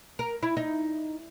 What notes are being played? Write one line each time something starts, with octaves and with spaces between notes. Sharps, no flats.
A#4
E4
D#4